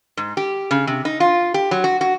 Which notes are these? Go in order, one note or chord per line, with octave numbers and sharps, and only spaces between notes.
G#2
G4
C#3
C3
D#4
F4
G4
F#3
F#4
F#4